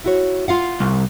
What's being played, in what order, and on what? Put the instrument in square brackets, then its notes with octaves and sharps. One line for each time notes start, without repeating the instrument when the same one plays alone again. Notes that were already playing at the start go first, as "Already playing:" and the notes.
[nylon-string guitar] E4 F#4 C#5
F4 F5 F#5
[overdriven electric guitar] C2